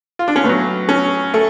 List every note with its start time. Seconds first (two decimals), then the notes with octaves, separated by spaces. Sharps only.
0.19 F4
0.28 D4
0.36 C#4
0.44 A2 F#3 B3
0.89 C#4
1.34 A3